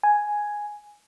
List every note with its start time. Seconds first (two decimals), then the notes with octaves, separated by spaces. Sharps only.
0.03 G#5